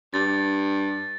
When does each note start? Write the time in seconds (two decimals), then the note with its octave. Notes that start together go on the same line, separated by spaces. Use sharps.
0.14 G2 A6